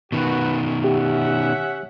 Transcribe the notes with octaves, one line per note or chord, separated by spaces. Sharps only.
B2 D#3 F#4 B4
C#4 G4 E5 F#5